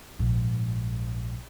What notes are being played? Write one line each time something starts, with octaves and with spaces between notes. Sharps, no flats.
A#1 G#2